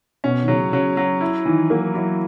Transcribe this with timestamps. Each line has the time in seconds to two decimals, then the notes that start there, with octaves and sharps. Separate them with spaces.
0.24 B2 C#4
0.42 D#3
0.48 C#3 F#3
0.72 C#3 F#3
0.97 F#3
1.21 E4
1.45 D#3 E3
1.70 F#3 A#3
1.94 F#3 E4